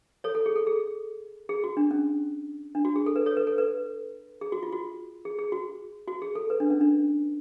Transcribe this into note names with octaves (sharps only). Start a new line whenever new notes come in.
A4 C#5
A4
G#4
A4
G#4
G#4
F#4
D4
C#4
D4
F#4
G#4
A4
B4
A4 C#5
B4
A4
B4
G#4
F#4
F4
F#4
G#4
G#4
F#4
F#4
G#4
A4
B4
D4
C#4
D4